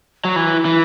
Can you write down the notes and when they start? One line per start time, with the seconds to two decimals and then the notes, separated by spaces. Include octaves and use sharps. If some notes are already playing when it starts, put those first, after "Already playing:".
0.25 F#3
0.36 E3 E4
0.65 E3